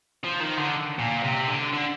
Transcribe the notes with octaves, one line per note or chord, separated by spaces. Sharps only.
F3
D#3
D3
A#2
C3
D3
D3